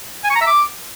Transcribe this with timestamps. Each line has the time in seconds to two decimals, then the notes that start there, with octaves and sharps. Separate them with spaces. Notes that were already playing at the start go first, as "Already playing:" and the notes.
0.24 G#5
0.30 C#6
0.35 A#5
0.41 E5
0.47 D6